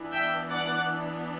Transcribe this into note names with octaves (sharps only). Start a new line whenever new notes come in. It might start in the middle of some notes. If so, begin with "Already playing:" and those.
Already playing: E3 B3 D4
E5 G5
D5 F#5